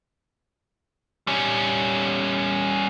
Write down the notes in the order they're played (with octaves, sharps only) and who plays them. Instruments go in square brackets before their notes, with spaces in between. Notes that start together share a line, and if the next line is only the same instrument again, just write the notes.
[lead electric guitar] G3 C#4